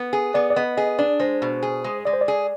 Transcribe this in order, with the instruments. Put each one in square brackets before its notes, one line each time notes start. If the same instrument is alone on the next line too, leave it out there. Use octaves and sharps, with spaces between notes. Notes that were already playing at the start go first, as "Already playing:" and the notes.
Already playing: [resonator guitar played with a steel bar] B3
G#4
[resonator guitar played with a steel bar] B3 [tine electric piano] D5
[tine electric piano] D5
[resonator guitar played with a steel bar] B3 [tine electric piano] D#5
[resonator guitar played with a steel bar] G#4 [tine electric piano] D#5
[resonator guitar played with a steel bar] D4 [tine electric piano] D5
[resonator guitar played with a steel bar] G#3 [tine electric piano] C5
[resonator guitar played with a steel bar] B2
G#4
G#3
[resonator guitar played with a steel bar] G#3 [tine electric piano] D5
[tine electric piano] C5
D5
[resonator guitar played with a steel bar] G#4